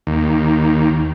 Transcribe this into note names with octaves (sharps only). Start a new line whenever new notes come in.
D#2